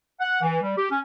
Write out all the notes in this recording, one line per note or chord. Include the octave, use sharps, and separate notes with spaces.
F#5
E3
G3
G4
C#4